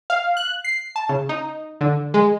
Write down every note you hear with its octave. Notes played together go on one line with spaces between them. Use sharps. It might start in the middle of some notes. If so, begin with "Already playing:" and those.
F5
F#6
C7
A5
C#3
D#4
D3
G#3